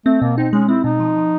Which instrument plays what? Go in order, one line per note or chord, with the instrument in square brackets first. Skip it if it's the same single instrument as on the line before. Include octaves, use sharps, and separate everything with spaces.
[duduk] A3 [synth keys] C4
[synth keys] B2 [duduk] A#3
[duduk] C4 [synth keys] D#4
[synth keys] G#3 [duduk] C#4
[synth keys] C4 [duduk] E4
[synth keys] B2 [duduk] D#4
[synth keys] F3
F3